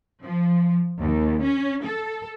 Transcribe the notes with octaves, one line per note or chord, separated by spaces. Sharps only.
F3
D#2
C#4
A4